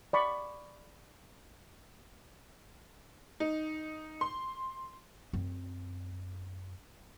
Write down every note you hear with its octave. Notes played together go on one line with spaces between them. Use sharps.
D5 B5 C#6
D#4
C6
F#2 C4